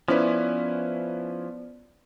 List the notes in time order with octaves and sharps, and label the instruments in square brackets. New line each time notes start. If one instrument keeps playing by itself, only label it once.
[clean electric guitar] F3 [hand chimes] B3 C5 D5 [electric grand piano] C#4 E4 B4